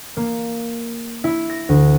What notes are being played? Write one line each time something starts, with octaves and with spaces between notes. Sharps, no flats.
A#3
E4
A#6
D2